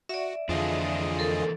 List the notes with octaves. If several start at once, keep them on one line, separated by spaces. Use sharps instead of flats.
F#4 D5 E5
F2 D3 E3 D4 F4 G#4 D#5
A4 A#4